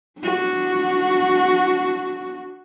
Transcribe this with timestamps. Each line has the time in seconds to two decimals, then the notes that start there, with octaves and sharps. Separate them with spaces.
0.20 D4 F#4